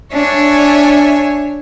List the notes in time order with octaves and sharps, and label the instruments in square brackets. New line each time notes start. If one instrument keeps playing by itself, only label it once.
[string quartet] D4 C#5 E5 G#5